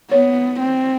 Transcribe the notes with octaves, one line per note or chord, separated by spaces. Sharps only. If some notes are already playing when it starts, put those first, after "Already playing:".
B3 C#5
C4